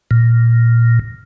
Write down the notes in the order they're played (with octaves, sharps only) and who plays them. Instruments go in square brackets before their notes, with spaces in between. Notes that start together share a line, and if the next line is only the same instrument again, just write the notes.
[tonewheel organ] A#2